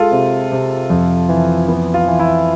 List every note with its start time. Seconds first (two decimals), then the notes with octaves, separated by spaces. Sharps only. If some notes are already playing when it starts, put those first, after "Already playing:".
Already playing: G#3 F4 A4
0.12 C3
0.52 C3
0.90 F2
1.29 E3
1.68 B3
1.94 F4
2.08 E3
2.19 E4